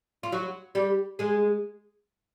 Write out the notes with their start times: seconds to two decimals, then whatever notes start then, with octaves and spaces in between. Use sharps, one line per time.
0.23 F4
0.32 F#3 F#4
0.75 G3 G4
1.19 G#3 G#4